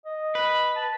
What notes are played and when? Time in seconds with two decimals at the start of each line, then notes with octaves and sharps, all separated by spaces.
0.05 D#5
0.35 B4
0.76 A5